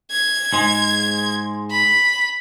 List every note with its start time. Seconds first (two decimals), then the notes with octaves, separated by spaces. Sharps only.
0.11 G#6
0.53 G#2 G#3
1.71 B5